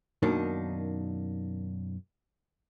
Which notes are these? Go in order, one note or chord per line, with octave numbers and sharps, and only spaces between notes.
F#2 B2 D#3 A#3 D4 D#4